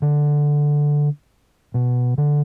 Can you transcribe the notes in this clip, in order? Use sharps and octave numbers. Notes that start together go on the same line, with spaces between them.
D3
B2
D3